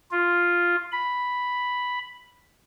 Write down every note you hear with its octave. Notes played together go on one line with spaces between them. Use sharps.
F4
B5